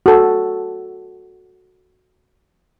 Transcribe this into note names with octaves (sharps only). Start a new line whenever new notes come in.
F#4 A4